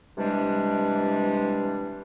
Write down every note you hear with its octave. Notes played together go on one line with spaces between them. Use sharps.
C3 E3 G3 G#3 D4